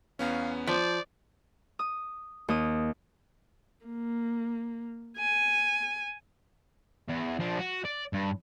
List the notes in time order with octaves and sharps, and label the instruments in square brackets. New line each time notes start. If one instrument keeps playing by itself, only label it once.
[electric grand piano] E2 B3 C#4 [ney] F5
[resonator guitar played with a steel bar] F3 [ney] C5 [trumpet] D5
[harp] D#6
D#2 D#6
[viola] A#3
G#5
[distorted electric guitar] E2
F3 D4
F#4
D5
G2